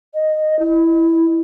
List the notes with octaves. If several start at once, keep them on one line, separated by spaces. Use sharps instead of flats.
D#5
E4